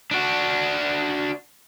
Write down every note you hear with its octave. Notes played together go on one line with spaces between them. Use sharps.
D4 F#4